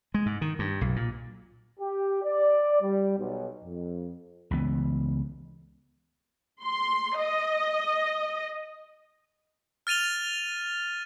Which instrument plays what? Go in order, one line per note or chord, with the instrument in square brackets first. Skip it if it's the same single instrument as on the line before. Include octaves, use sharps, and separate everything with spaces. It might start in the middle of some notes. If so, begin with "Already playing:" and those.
[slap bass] G#3
G#2
D#3
G2
B1
A#2
[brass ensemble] G4
D5
G3
B1
F2
[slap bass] C#2 E3 B3
[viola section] C6
D#5
[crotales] F6 A6 D#7 F7 G7